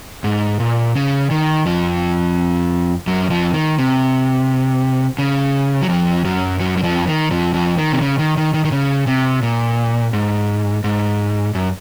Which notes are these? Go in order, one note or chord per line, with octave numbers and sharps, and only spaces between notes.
G#2
A#2
C#3
D#3
F2 F3
F#2 F#3
F2 F3
D#3
C3
C#3
F#3
F2 F3
F#2 F#3
F#2 F#3
F#3
F2 F3
D#3
F2 F3
F2 F3
D#3
C3
C#3
D#3
D#3
D#3
D#3
C#3
C3
A#2
G#2
G#2
F#2